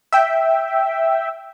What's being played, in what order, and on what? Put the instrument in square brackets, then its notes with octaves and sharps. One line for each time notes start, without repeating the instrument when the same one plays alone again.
[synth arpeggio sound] E5 G5